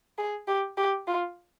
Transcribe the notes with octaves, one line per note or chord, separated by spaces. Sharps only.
G#4
G4
G4
F4